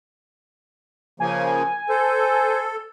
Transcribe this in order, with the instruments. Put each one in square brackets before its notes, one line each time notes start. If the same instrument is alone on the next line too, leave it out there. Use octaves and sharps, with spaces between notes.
[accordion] C#3 F3 A#3 [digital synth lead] G#5
[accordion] A4 [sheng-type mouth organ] C5